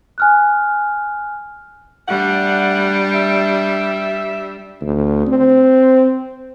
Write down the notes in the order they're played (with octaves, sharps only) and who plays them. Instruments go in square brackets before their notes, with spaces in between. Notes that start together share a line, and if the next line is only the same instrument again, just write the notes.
[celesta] G#5 F6 F#6
[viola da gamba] G3 D4 [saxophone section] A3 F#5
[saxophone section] E5
[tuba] D2
C4